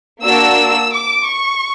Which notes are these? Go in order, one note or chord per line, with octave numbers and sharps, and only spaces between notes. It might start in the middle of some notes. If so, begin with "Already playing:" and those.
A#3 D4 F#4 E6
D6
C#6